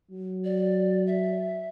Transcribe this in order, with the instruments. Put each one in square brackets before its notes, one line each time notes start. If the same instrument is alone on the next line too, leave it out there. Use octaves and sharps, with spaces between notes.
[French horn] F#3
[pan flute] D5
E5